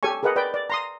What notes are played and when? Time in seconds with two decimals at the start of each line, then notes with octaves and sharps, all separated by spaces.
0.03 G4 A4 C#5 G#5 C#6
0.23 G#4 A#4 B4 D#5 F#5
0.36 B4 D5 G5
0.54 D5
0.70 A#5 C6 D#6